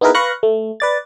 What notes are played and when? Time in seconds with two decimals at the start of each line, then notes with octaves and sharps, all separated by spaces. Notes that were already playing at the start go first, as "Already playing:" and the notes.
0.01 B3 D#4 E4 G#4 A#4 B4
0.15 B4 F5 C#6 F#6 A#6
0.43 A3
0.80 B4 D5 A6